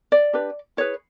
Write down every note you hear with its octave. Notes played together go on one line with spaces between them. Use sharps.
D5
D4 G4 B4
E4 G#4 B4 C#5